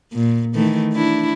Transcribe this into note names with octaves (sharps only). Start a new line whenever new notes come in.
A#2
D#3 E3 A3
D4 E4